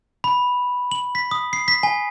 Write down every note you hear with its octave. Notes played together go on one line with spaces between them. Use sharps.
B5
F#7
B6
D#6
C7
B6
G#5